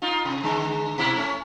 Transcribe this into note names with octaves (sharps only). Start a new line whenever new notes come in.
D#4 F4
C3
D3 G#3
B2 E4
A3 C#4